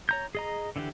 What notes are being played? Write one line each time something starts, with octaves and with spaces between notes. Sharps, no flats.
C#5 A#5 G6
G#4 D#5 A#5
D3 E3 D4 G4